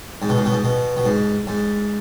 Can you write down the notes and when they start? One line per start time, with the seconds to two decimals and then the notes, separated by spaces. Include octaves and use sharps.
0.22 G#2
0.29 B2
0.38 G#2
0.46 B2
0.52 G#2
0.64 B2
0.97 B2
1.05 G#2
1.47 G#2